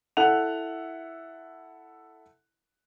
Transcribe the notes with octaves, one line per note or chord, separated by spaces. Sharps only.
E4 A4 F#5 F#6 F7